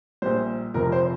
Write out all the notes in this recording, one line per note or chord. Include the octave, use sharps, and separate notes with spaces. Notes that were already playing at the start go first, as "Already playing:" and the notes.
A#1 A#2 G3 C5
F1 F2 C3 F3 A#4
C5